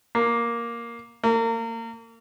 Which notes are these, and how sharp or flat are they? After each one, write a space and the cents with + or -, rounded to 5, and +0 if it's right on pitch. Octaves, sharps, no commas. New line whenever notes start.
A#3 +5
A#3 -30